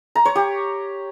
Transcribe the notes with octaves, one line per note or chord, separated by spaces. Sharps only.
A#5
C#5
G4